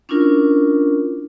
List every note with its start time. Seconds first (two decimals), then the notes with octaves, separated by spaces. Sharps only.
0.09 C#4 D4 E4 F4 A#4